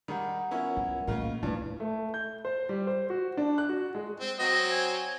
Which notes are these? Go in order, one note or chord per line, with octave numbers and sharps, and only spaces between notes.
D#3 G3 G#3 F#5 A#5
B3 C#4 E4 F4 A#4 F#5
F#3
D#1 A2 C#3 F4 A#4 D#5
D1 G2 F3 E4 B4
A3
G6
C5
G3
C5
F#4
D4
F#6
F#4
G#3
C4
F#3 C4 D#5
G#5